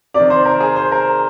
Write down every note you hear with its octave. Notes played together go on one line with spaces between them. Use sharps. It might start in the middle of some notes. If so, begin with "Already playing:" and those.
C3 D#3 D5
C5
A#4
G#4
C5
A#4